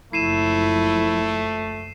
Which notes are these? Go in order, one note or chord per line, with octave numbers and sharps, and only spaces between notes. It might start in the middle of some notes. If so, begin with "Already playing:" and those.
F#1 F3 A3 E4 C7 D#7 E7